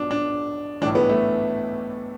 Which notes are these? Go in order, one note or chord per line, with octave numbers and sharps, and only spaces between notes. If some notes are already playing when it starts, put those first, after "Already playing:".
Already playing: B1 B2 D4
D4
B1 A2 E3 D4
B3
A3